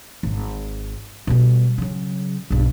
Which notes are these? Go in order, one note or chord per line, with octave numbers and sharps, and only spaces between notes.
G#1
B2 G3
C#3 F#3
B1 G2